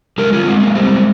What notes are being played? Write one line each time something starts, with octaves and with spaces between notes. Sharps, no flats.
G#3 G4 A#4
F4 G#4
A#3
G#3 C4
A#3
G3 C4